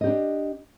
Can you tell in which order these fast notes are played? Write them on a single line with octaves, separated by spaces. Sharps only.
D#5 G4 D4